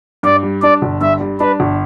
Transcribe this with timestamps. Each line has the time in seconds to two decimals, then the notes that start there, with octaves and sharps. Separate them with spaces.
0.23 G2 D5
0.43 G3
0.62 D4 D5
0.82 G1
1.01 G2 E5
1.20 G3
1.40 D4 B4
1.60 G1